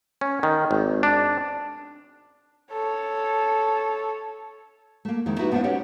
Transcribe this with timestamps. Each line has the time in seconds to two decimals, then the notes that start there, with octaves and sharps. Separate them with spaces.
0.21 C#4
0.43 D#3
0.71 G#1
1.03 D4
2.72 A4 C#5
5.05 A3 A#3
5.26 F2 D#3 G#3 E4
5.38 D#4 E4 F#4 G4 B4
5.52 B3 D4 F4 C5 E5 F#5
5.64 C#4 G4 C#5 D5 F#5